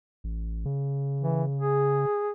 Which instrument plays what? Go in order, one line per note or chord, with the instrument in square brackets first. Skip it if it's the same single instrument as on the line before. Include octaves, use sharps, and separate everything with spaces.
[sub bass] A1
C#3
[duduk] E3
G#4